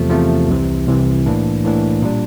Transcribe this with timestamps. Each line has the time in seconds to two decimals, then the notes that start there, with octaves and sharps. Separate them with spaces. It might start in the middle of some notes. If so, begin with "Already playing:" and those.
Already playing: E2 C3 F3 A3
0.10 E2 C3 F3 A3
0.49 C2 C3 E3
0.88 C2 C3 E3
1.26 A2 E3 A#3 D4
1.65 A2 E3 A#3 D4
2.02 A#2 G3 D4